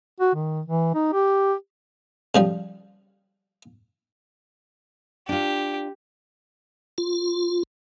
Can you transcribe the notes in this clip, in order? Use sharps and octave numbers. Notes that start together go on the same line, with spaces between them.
F#4
D#3
E3
D#4
G4
C#3 F3 G3
D4 F4 G4
F4